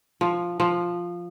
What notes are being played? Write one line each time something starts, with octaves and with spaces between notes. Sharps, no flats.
F3
F3